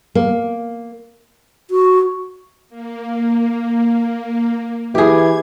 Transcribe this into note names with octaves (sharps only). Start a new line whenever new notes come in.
A#3
F#4
A#3
E3 G4 G#4 G#6